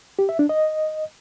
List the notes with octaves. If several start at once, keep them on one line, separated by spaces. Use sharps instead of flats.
G4
E5
D4
D#5